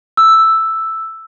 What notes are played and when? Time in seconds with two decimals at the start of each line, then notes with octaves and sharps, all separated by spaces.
0.17 E6